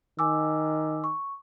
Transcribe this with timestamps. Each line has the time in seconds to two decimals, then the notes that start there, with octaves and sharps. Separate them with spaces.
0.19 D#3 G#5 D6 E6
1.04 C#6